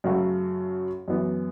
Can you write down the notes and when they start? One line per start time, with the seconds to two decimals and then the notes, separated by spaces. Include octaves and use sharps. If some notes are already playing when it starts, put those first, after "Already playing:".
0.04 F#2 C#3 A3 F#4 A4
1.08 F#2 E3 B3